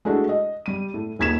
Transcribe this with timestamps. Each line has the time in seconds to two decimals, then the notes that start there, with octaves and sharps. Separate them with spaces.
0.05 G#3 A3 D4 E4 F#4
0.29 D#5
0.66 G3 D#7
0.94 A2
1.19 D#1 D#3 G#6 B6 E7